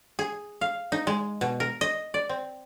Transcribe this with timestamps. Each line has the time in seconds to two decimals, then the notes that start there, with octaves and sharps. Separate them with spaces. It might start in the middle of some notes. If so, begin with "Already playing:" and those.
0.19 G#4
0.61 F5
0.92 D#4
1.07 G#3
1.41 B2
1.60 A#4
1.81 D#5
2.14 D5
2.29 C4